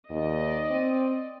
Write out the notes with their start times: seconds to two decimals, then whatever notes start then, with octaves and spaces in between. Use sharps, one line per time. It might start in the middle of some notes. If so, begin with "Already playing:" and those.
0.11 D#2 D5 D#5
0.71 C4